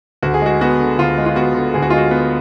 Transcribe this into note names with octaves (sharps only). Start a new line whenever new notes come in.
D2 F#4
G#4
G#3 F#4
B3 F#4
D3
D2 F4
G#3
F4
B3 F#4
D3
D2 G#4
F#4
G#3 F4
F#4
B3